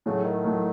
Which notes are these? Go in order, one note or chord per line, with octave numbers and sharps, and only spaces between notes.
A2 C#3 F#3 A3
D#3
A2 F#3 A3